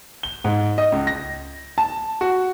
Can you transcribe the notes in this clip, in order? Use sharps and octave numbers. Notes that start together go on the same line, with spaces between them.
G7
G#2
D#5
C#2
A#6
A5
F#4